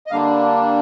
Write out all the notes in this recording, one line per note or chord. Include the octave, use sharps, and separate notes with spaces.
D#5
D3 G3 A#3 D4 F5